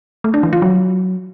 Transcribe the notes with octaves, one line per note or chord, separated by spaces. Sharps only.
A3
D4
E3
F4
F#3